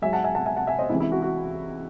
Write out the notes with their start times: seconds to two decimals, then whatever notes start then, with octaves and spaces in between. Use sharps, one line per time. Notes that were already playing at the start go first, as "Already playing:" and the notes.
0.02 G#2 F#3 E5 G#5
0.13 F#5 A5
0.24 E5 G#5
0.35 F#5 A5
0.46 E5 G#5
0.57 F#5 A5
0.67 E5 G#5
0.79 C5 D#5
0.90 C#2 C3 E3 E4
1.00 E4
1.12 F#4
1.22 F#4